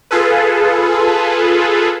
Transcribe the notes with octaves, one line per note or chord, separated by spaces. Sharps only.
F4 G#4 A4 B4